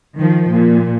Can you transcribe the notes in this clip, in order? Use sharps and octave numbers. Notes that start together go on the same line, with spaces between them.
D#3 F3
A#2